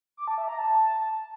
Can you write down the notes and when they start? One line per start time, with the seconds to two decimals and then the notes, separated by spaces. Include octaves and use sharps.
0.17 D6
0.28 A5
0.38 E5
0.48 A#5
0.58 A5